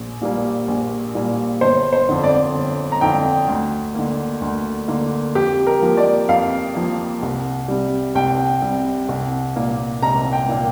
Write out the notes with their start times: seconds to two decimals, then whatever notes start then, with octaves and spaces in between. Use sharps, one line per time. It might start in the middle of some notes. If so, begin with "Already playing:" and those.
Already playing: A#1
0.22 A#2 G3 A#3
0.68 A#1
1.15 A#2 G3 A#3
1.61 G1 C5
1.93 C5
2.09 F2 D3
2.24 D5
2.54 G1
2.92 A#5
3.01 F2 D3 G5
3.48 D2
3.95 D3 A#3
4.41 D2
4.88 D3 A#3
5.35 F2 G4
5.67 A#4
5.82 F3 A#3
5.97 D5
6.29 F2 F5
6.75 F3 A#3
7.23 C2
7.68 C3 G3
8.15 C2 G5
8.62 C3 G3
9.09 C2
9.56 A#2 A#3
10.02 C2 A#5
10.33 G5
10.49 A#2 A#3